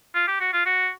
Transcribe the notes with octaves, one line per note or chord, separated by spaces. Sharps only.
F4
G4
F#4
F4
F#4